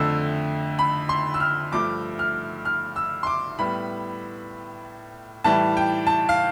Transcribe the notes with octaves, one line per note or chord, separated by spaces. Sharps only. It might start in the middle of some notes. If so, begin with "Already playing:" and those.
Already playing: F2 D3 A3 E6
B5
C6
E6
F6
G2 F3 A3 D6
F6
F6
E6
C6
D6
A2 G3 B3 B5
A2 E3 G3 A5
G5
A5
F5